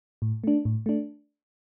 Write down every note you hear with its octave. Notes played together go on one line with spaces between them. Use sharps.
A2
A3 D4
A2
A3 D4